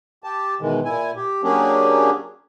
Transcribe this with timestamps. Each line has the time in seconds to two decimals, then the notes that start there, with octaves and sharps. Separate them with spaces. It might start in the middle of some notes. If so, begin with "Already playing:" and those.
0.24 G4 A5
0.61 B2 D#3 E3 G#3
0.85 A#2 E4 G#5
1.16 G4
1.44 F#3 A#3 C#4 D4 G4 G#4